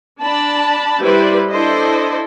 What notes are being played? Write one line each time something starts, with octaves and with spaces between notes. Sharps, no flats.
D4 A5 B5
G3 E4 B4 C5 D5
D4 E4 A4 C5 D#5